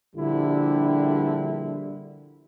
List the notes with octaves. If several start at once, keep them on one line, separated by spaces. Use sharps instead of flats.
A#1 D3 G3 E4